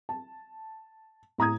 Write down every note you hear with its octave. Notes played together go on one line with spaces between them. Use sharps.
A5
A2 A#5 D#6 G#6